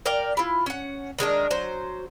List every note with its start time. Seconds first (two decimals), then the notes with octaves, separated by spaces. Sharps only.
0.06 A#4 D5 F5 G5
0.37 E4 F4
0.66 C#4 F#5
1.19 D#3 G#3 D4 A#4
1.51 F#3 C5